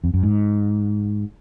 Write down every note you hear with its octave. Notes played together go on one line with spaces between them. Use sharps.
F2
F#2
G#2